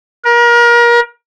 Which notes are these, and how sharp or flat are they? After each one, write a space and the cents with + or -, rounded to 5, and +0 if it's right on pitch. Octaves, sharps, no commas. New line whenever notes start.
A#4 +30